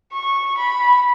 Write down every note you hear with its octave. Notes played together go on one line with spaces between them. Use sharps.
C#6
B5